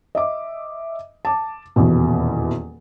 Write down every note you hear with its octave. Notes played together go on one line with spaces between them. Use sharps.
D#5 E5 D6
A5 D6
D#1 E2 B2